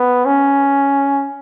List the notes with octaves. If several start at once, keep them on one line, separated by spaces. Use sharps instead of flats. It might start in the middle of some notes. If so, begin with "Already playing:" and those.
Already playing: B3
C#4